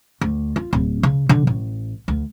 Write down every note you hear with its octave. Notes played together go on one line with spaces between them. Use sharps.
D2
F4
D1
C#3
D3
A1
D2